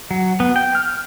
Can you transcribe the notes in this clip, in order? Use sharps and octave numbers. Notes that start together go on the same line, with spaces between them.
F#3
B3
G5
F6